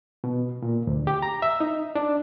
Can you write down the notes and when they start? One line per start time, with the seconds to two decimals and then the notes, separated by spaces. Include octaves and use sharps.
0.24 B2
0.62 A#2
0.87 D2
1.07 G4
1.22 A#5
1.42 E5
1.60 D#4
1.95 D4